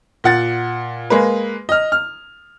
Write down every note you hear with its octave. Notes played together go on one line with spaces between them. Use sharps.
A#2 F#5 A6
G#3 A#3 B4
D#5 F6
F6